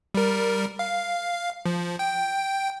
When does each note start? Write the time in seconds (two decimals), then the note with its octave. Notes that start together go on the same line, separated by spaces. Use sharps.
0.14 G3 A#4
0.79 F5
1.66 F3
1.99 G5